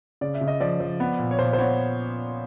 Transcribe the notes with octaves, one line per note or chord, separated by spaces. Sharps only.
C#3 D5
E5
C#3
D#5
F3 D5
F3
B3
A#2
C#5
A#2 C5
C5
B3 C#5